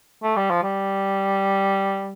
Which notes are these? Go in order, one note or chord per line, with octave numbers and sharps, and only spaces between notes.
A3
G3
F3
G3